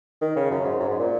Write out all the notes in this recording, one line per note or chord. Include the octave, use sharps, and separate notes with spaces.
D#3
C#3
F#2
G#2
F#2
G#2
A#2